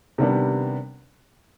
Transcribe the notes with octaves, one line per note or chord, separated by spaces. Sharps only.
C3 D#3 G3 B3 D4